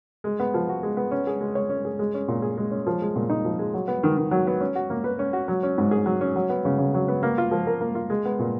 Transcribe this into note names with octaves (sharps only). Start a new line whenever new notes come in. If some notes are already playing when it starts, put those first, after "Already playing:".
G#3
B3
F3
F#4
G#3
B3
C#4
G#4
G#3
C#5
C#4
G#4
G#3
C#4
A#2
G#4
G#3
C#4
F3
G#3
A#2
D#4
F3
G#3
F#3
B3
D#3
D#3
F#3
B3
C#4
F#4
A#3
B4
C#4
F#4
F#3
C#4
G#2
G#4
F#3
C#4
F#3
B3
C#3
C#3
F#3
B3
A#3
F4
F3
A#4
A#3
F4
G#3
B3
A#2